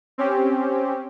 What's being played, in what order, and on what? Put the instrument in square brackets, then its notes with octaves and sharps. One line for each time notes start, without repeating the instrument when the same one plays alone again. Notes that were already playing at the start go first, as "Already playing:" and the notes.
[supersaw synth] C4 C#4 G4